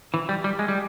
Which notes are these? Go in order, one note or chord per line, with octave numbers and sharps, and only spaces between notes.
E3
G3
G3
G#3
G3